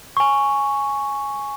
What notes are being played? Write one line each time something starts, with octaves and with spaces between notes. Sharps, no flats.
G#5 C#6